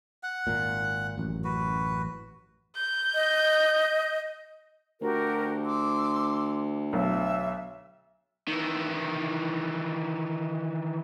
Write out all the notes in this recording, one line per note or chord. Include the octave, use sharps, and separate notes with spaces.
F#5
G#1 A#2
A1 F#2
F#4 B4
G6
D#5
D2 F#4 G4 A#4
C6 D6 E6
B1 E5
D#3 E3